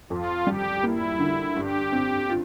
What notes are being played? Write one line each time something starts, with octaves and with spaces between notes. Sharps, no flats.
F2 F4
G3 G4
A#3 E4
D3
G2 G4
C4
F4